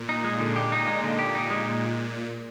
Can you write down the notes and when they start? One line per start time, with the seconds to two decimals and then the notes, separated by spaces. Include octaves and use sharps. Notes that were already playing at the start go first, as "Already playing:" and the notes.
Already playing: A#2
0.09 D#4
0.24 G#3
0.40 D3
0.56 G4
0.72 D#4
0.87 G#3
1.04 D3
1.19 G4
1.35 D#4
1.50 G#3